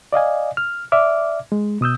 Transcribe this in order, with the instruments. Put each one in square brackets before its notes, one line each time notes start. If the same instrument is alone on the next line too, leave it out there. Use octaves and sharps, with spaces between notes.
[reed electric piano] D5 D#5 F5 G#5
F6
D5 E5 D6 F6
G#3
B2 D#6 E6 G6